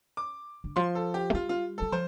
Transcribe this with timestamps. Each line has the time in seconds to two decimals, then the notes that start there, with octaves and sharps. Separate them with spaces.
0.17 D6
0.64 D3
0.76 F3 C6
0.95 A4
1.14 G4
1.30 A3
1.34 G3 F4
1.49 F4
1.78 G3 A4
1.92 F3 C5